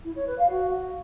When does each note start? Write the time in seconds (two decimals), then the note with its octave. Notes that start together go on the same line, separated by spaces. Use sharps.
0.04 E4
0.16 C#5
0.27 B4
0.39 F5
0.50 F#4